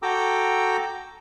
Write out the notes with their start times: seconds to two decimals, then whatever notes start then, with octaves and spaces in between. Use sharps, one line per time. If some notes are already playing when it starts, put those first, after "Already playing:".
0.03 F#4 A4 G5 A#5 D6 E6